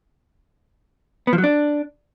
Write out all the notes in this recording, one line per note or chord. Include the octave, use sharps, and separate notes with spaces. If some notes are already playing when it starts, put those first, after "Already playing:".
B3
F3
F#3
D4